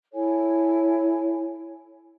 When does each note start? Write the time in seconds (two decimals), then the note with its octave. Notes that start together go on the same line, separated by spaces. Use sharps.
0.13 E4 A4 C#5 G#5